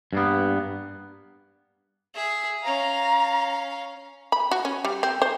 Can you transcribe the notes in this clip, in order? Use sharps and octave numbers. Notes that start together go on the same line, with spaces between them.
G2 A#3 B3
G#4 E5
C#4 F5 A#5
B5
F#4
C#4
G3
C4
C5